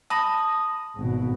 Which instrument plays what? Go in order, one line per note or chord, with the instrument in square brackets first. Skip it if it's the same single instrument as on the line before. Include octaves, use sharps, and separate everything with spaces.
[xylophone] A5 B5 A#6 [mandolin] D#6
[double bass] G#1 B2